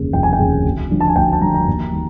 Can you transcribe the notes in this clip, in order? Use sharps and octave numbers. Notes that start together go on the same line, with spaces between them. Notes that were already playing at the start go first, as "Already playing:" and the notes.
Already playing: F1 D#2 C#3
F1 G5
G#5
G5
D#2 C#3
D2
D3 F3
A5
G#5
D2 G5
A5
D3 F3 A#5
A#5
D#2
D#3